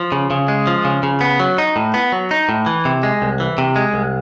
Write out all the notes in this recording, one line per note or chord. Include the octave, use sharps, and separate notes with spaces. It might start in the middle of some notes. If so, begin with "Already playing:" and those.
Already playing: F3
C#3
C#3
G#3
F3
C#3
C#3
B3
F#3
D#4
A2
B3
F#3
D#4
A2
E3
C3
G#3
C2
E3
C3
G#3
C2